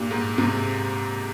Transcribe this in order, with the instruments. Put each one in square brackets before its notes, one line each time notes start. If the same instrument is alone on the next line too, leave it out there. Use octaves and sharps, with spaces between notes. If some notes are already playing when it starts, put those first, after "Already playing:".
Already playing: [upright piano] G2 A#2
G#2
G#2 C3